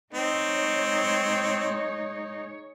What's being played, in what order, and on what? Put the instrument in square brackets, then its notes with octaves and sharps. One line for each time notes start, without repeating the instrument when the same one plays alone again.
[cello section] G#3 C#5 [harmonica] C4 [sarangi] D#4